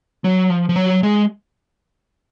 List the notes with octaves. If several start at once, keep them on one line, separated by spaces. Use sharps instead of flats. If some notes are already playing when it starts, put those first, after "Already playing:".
F#3
F3
F3
F#3
G#3